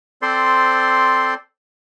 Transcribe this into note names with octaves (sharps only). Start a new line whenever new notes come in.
C4 A4 C5 D5 C6